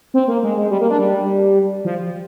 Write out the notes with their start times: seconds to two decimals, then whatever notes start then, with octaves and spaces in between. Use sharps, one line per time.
0.14 C4
0.28 A#3
0.43 G#3
0.57 G#3
0.71 G3
0.81 A#3
0.90 D4
0.99 G3
1.85 F3